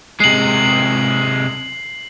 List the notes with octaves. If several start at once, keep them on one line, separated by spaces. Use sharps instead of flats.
C3 G#3 C7 F#7